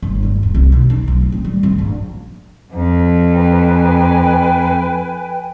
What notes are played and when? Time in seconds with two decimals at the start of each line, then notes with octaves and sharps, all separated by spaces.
0.02 G1
0.23 G#2
0.43 D#1
0.55 C2
0.72 B2
0.90 D#4
1.08 B1
1.21 A2
1.32 C4
1.44 G3
1.63 G#1
1.78 A#1
2.73 F2
3.33 B4 G5 G#5